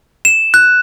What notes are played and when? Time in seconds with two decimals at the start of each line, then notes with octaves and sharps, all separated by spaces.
0.25 E7
0.54 F#6